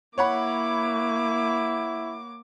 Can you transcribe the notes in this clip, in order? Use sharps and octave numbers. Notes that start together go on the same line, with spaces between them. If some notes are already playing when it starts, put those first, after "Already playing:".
A#3 E4 C#5 F#5 B5 D6